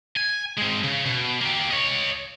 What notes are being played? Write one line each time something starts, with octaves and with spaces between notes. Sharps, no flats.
G#5
G#3 C4
C#3
B2
A#3 G4
C#5 D#5